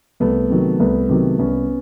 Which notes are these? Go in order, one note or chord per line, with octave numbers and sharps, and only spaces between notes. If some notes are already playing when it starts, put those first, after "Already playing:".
C2 A3 B3
C3 D#3 F#3
C2 A3 B3
C3 D#3 F#3
C2 B3 C#4